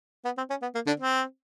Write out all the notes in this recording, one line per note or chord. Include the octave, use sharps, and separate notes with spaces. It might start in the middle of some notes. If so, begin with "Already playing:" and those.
B3
C4
C#4
B3
A#3
D3 D4
C4